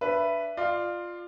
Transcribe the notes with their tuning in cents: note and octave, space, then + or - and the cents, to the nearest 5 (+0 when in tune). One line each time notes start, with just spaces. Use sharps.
D4 +0 B4 +0 E5 +20
F4 +0 D5 +30